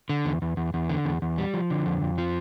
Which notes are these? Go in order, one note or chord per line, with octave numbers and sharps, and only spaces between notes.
D3
E2
E2
E2
E2
D3
E2
E2
G3
F3
D3
F2
F2
F3